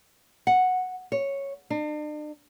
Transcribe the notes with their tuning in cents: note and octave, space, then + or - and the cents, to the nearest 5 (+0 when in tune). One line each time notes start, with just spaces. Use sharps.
F#5 -5
C#5 -5
D4 +45